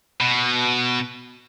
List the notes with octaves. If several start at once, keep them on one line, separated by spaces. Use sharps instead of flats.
B2